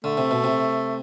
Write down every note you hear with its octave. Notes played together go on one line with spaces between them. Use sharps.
D3 A3
C3
B2
C3